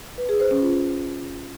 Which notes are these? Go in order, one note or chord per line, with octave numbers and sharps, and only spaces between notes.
B4
G#4
C5
C#4
F4